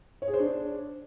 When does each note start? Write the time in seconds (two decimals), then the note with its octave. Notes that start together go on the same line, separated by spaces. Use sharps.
0.22 C#5
0.28 G#4
0.33 C5
0.39 D4